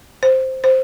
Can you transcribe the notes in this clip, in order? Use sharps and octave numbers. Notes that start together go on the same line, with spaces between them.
C5
C5